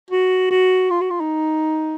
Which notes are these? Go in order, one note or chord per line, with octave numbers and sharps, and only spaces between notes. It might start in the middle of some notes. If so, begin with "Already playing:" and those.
F#4
F#4
F4
F#4
F4
D#4